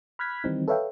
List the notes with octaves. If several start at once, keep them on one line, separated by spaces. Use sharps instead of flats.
B5 F6 F#6 G#6 B6
D#3 E3 G3 C4 D#4
A4 B4 C#5 E5 F5 G5